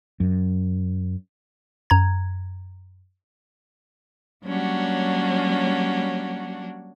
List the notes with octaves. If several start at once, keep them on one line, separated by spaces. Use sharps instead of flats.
F#2
F#2 A#5 G#6
F#3 G3 A#3 C#4 D4 F#4